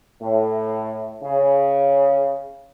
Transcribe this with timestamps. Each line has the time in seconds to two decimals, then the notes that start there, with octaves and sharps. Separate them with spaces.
0.21 A2
1.23 C#3